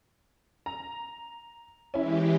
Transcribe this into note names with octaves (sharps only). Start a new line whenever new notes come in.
A#5
E3 G#3 C#4 E4 G4